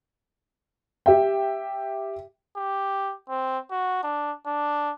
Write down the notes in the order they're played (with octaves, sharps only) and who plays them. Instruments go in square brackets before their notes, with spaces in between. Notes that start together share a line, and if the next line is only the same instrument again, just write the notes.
[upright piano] G4 E5 G5
[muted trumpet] G4
C4
F#4
D4
D4